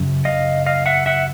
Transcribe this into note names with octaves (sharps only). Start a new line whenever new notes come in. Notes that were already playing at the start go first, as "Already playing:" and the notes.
Already playing: F#2 C#3
D#5 F5
D#5 F5
E5 F#5
E5 F#5